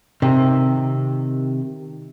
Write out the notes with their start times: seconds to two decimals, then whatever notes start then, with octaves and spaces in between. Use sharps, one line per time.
0.22 C3 D#3